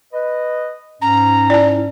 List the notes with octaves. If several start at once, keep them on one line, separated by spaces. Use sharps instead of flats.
B4 D#5
G#2 C#4 A#5
E4 D5 A5